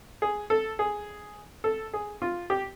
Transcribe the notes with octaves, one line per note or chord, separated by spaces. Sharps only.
G#4
A4
G#4
A4
G#4
F4
G4